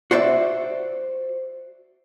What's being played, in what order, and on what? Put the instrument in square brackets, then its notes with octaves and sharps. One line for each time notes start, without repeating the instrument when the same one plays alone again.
[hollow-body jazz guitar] F#4 C5 D5 E5